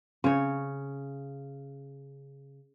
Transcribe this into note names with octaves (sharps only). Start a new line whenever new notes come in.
C#3 C#5